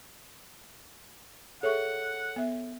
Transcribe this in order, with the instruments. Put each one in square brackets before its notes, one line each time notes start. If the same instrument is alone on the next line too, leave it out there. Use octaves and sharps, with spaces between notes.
[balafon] G#4 E5 C#6 [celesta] A4 C#5 [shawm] F#5
[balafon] B3 E5